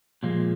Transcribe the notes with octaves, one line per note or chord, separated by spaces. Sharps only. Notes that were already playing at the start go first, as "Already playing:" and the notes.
A#2 F3 G#3